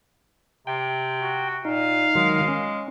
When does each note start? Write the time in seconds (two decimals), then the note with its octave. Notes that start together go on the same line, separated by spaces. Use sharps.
0.67 C3 G5
1.21 F#4
1.65 A#2 D#4 F5
2.15 D#3 F#3 G#3
2.48 C#4